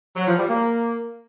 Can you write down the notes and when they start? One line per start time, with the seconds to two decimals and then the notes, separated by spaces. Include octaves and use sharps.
0.16 F#3
0.27 F3
0.37 G3
0.48 A#3